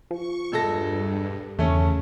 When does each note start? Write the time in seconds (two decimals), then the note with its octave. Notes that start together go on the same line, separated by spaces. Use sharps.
0.11 F3 C#6
0.52 E1 G2 A4 A#6
1.59 E2 C#3 A3 C#4